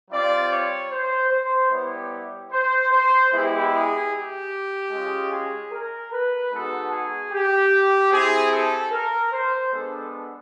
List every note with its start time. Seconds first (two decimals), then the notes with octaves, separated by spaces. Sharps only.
0.11 G3 C4 F4 D5
0.51 C#5
0.91 C5
1.31 C5
1.71 G3 B3 E4 G4 C#5
2.52 C5
2.91 C5
3.32 G#3 B3 E4 G4
3.71 G#4
4.11 G4
4.91 G#3 C#4 F4
5.32 G#4
5.71 A#4
6.12 B4
6.51 G#3 B3 D#4 F#4 A4
6.92 G#4
7.32 G4
8.11 C4 E4 G4 G#4
8.51 A4
8.91 A#4
9.32 C5
9.72 G#3 B3 D4 A4